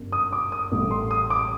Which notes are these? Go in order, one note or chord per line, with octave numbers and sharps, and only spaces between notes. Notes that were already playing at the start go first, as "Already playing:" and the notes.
Already playing: G1 F#2
D#6
D6
D#6
A1 A2 G3
C6
D#6
D6